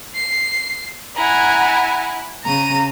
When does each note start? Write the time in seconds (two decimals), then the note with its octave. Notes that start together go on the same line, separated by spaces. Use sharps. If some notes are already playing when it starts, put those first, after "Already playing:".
0.16 C7
1.16 E4 F#5 G#5 A#5
2.44 C#3 A#5 D#7